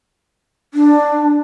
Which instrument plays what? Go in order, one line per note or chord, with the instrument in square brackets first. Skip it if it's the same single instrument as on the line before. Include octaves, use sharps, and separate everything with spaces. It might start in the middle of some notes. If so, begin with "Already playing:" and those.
[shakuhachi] D4